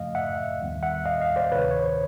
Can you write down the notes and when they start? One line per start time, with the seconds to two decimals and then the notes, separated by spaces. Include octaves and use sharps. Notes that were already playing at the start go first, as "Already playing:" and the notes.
Already playing: F#2 C#3 F3 A3 D#5 F5
0.15 E5 F#5
0.60 D#2 D#3 G3 B3
0.83 E5 F#5
1.06 D#5 F5
1.21 D#5 F5
1.36 C5 D5
1.52 D2 C3 D#3 B4 C#5
1.71 C#5
1.84 C5